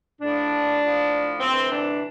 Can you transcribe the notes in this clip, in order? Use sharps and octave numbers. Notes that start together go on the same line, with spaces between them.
A2 F3 D4
A2 F3
D2 C3 E3 C4
D4